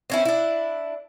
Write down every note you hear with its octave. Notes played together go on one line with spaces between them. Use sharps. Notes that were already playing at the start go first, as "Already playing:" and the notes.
C4 C#4 E4
D4 E4